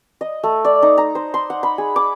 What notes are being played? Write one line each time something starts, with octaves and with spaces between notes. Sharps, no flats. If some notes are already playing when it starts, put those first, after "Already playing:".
D#5
A3
D5
D#4
A#5
C5
C6
F#5
B5
G#4
D6